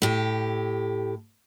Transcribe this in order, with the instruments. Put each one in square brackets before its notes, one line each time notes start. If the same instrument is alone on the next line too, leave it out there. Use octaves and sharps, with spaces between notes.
[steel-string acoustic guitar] A2 G4